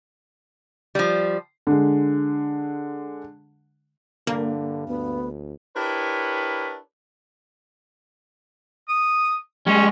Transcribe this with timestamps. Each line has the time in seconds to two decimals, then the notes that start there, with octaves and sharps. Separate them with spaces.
0.95 F3 G3
1.67 D3 G#3
4.27 G2 D3 A#3
4.88 D2 B3
5.76 D4 E4 G4 A#4 B4 C#5
8.88 D#6
9.67 G3 G#3 C#4